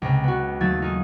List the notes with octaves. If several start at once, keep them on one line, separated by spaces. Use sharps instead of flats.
C#2 C3
B3 F#4
D#2 F#3 A3 E6 G#6 A6
D#4 F4 G#4